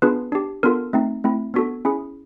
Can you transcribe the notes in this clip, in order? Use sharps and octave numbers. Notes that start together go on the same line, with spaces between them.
B3 D4 F4 G#4 B4
D4 G4
B3 D4 F4 A4 A#4
A3 C4 D#4
A3 C4 E4
B3 D4 F#4 A4
C#4 E4 G#4